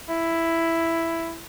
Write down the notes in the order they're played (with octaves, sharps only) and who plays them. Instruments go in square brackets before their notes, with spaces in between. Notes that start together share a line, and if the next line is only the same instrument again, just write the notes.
[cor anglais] E4